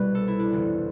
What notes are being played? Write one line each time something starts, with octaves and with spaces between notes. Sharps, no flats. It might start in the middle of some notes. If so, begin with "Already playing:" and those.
Already playing: C2 B2 G3 B4
A4
E4
D4
G1 F2 E3